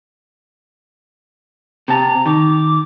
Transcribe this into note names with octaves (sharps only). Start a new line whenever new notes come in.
C3 A5 A#5
D#3 D6